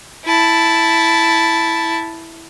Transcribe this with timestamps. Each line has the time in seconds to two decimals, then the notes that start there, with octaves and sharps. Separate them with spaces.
0.25 E4 A5